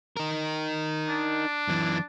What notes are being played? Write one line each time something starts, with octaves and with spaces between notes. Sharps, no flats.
D#4 A#4
D4
F#2 E3